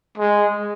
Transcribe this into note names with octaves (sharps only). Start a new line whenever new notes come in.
G#3